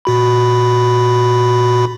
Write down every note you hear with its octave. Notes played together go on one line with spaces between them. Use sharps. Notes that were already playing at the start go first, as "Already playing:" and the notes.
A#2 F#4 B5